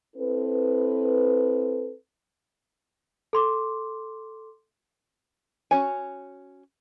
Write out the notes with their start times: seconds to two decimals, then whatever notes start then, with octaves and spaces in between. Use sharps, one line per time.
0.17 C4 E4 A4 B4
3.33 A4 C6 D6
5.71 C#4 F#4 C#5 G#5